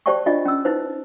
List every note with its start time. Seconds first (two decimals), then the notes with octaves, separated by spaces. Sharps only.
0.06 G4 C5 D5 G5 A5 C#6
0.26 D4 F4 D5 D#5
0.45 C#4 E6
0.65 D#4 E4 B4 C5